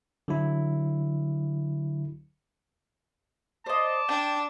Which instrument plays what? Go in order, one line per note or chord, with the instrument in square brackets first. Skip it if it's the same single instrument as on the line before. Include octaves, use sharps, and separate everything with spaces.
[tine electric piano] D3 F#3 E4
[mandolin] C5 D#5 [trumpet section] D5 A5
[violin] D4 [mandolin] G5